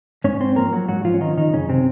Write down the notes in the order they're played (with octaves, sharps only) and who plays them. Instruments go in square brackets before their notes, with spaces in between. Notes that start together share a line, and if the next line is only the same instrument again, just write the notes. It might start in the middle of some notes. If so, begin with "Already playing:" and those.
[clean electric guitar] G#2 C#4 C#5
C4 C5
F3 A#3 A#4
F#3 F#4
G#2 F#3 F#4
F3 F4
C#4
D#3 F3 D#4
D#3 D#4
F#2 C#3 C#4
C3 C4